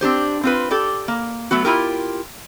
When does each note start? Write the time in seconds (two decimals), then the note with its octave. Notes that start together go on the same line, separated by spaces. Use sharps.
0.01 C4 D4 G4 C5
0.43 C4 F4 B4
0.71 G4 A4 D5
1.08 A#3
1.51 F#3 A3 B3 F#4
1.65 E4 F4 G4 A#4